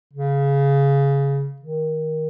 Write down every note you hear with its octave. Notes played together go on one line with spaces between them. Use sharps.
C#3
D#3